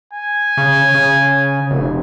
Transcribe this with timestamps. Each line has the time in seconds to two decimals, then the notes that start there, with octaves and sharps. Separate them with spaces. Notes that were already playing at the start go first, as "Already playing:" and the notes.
0.13 G#5
0.57 C#3
0.94 C#3
1.71 F1